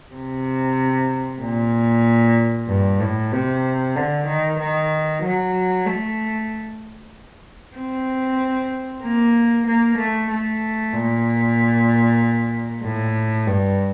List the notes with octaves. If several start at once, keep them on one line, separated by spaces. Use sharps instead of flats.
C3
A#2
G2
A2
C3
D3
D#3
D#3
F#3
A3
C4
A#3
A#3
A3
A3
A#2
A2
G2